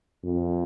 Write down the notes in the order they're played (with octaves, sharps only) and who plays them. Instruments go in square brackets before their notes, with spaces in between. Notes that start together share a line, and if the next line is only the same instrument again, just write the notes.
[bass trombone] F2